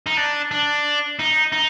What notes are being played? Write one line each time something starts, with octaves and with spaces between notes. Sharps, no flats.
D#4
D4
D4
D#4
D#4